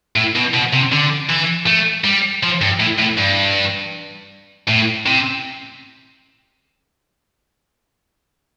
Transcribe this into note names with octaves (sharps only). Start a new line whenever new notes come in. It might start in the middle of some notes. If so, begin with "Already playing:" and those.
A2
B2
B2
C3
D3
E3
A3
G3
F3
G2
A2
A2
G2
A2
C3